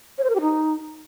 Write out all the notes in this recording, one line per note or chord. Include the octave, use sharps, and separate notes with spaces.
C#5
C5
A#4
G4
D#4